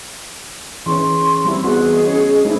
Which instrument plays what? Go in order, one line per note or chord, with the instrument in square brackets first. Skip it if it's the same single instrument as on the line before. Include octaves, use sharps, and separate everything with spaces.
[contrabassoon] C#3 [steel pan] E3 C#4 [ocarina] C6 [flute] C#6
[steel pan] G3 C4 E4
[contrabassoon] E2 [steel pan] F#4 [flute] G#4
[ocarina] D#5
[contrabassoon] C#3 [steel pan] C#5
[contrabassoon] G#2 [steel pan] A3 E4